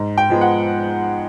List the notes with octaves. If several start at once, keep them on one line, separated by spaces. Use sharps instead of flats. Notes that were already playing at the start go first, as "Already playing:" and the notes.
Already playing: G#2
G5
F3 G#3 B3
F#5